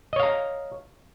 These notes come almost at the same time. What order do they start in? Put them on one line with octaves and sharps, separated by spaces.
D#5 C#5 F5 A#5